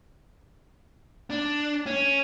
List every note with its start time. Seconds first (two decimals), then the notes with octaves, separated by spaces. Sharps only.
1.30 D4
1.86 C#4